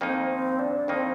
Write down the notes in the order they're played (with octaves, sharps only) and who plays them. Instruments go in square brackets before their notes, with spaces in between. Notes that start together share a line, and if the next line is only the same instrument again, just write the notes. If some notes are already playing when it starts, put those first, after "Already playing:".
[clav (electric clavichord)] F2 D#3 A#3 D#4 [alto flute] C4
[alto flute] C4
D4
[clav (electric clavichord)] F2 D#3 A#3 D#4 [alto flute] C4